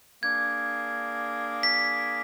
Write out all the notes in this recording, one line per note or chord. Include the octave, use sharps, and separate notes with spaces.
A#3 D4 G#4 G#6
B6